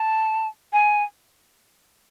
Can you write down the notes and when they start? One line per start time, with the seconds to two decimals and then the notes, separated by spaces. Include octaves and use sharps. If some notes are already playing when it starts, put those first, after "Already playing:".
Already playing: A5
0.73 G#5